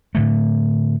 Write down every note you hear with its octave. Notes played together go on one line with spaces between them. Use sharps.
A2 D3 A3